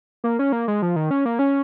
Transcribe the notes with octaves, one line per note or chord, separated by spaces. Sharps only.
A#3
C#4
A#3
G#3
F3
D#3
C#4
A#3
C#4